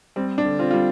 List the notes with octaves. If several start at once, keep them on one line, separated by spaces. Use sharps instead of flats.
G3 C4
D4
D3
C4 F4
G3 F4